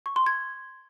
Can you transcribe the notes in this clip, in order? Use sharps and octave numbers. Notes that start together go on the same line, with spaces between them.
C#6
C6
G#6